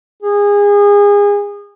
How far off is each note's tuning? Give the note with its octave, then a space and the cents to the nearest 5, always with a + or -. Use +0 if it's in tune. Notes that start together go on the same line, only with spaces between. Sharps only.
G#4 -30